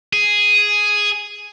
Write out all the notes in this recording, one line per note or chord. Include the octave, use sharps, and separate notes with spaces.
G#4